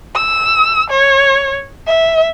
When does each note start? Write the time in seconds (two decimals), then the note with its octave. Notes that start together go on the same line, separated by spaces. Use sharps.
0.15 E6
0.90 C#5
1.87 E5